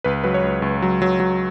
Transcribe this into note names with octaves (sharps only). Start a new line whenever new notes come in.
C#2 B4
F#3 B4
C#5
C#2
C#2
F#3
F#3
F#3